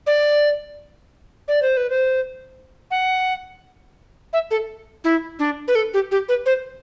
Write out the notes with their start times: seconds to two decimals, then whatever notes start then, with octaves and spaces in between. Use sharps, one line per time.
0.07 D5
1.48 D5
1.62 C5
1.77 B4
1.90 C5
2.91 F#5
4.33 E5
4.51 A4
5.04 E4
5.39 D4
5.68 B4
5.75 A4
5.94 G4
6.11 G4
6.29 B4
6.46 C5